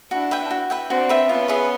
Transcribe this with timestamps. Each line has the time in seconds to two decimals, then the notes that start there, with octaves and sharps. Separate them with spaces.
0.11 D4 E4 F#4
0.31 B4 E5 G5
0.51 F#4
0.70 B4 E5 G5
0.89 C4 D4 F#4
1.09 B4 E5 G5
1.29 B3 C#4 F4
1.48 G#4 B4 E5